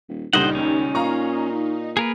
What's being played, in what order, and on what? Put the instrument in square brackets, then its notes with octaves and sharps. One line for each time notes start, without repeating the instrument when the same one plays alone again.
[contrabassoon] D#1
[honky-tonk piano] C#2 A#2 G3 [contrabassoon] D3 [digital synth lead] D#4 [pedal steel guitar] C5 D#5 F#5
[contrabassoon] D#2 [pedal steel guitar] C#4
[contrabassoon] A#2 [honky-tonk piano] F5 A#5 C#6
[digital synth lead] A#3 [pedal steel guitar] G#4 A#4 B4